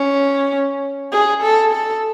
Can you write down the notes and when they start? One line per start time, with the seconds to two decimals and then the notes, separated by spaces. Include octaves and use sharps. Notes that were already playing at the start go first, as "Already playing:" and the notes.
Already playing: C#4
1.12 G#4
1.43 A4
1.73 A4